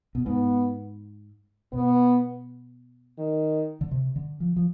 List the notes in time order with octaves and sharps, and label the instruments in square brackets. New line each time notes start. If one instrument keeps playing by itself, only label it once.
[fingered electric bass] B2
[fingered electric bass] G#2 [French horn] B3
[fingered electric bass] B2 [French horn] B3
[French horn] D#3
[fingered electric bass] D3
C3
D3
F3
F3